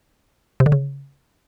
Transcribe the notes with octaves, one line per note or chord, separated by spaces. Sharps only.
C3
D3
C#3